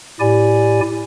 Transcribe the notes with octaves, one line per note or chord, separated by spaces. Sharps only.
A2 E4 G4 D5 G#5